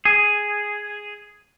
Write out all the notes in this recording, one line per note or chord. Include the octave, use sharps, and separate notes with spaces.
G#4